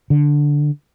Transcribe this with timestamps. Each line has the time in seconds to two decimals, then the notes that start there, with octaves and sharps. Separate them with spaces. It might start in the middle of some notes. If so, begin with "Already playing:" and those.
0.10 D3